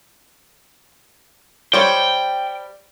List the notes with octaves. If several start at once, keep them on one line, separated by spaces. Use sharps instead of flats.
G3 C5 C#5 G5